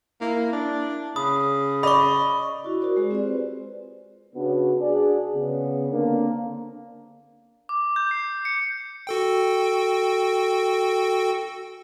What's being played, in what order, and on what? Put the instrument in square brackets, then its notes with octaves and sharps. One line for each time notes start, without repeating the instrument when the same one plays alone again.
[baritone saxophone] A#3 [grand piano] E4
[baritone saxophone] D4
[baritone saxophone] C#3 [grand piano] B5 [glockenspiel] D#6
[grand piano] D5 D#5 [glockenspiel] B5 C#6
[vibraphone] E4 F#4
F#4 A#4 C5 D5
G#3 G#4
C4 F4 G4 C5 D5
B4
[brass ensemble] C#3 B3 D4 F#4
D4 F#4 G#4 D5
C#3 B3
D3 A#3 C4 D4
[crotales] D6
G6
C7
C#7
[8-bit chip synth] F#4 A4 G5